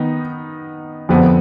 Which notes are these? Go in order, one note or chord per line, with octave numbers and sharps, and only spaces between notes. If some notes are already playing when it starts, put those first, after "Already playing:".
Already playing: D#3 B3 D#4
F2 D3 F3 B3